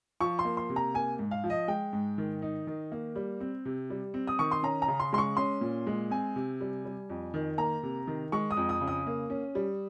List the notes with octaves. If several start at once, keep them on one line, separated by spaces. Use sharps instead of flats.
F3 C#6
C6
A#3
C6
C3
A#5
A#3 G#5
G#2
F5
F3
D#5
G#3 G5
G#2
D#3
D#4
D#3
A#3
G3
C4
C3
G3
C4
D#6
D#3 C#6
C6
C#4 A#5
A#5
C#3
C6
G#3 C6
C#6
C#4 C6
A#2
G#3
C4 G#5
C3
G3
G3
F2
D#3
A#3 A#5
C3
D#3
G#3 C#6
D#6
F2
D#6
C#3
D#6
A#3
C#4
G3